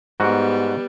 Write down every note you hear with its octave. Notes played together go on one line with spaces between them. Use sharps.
G#2 G3 B3 F#4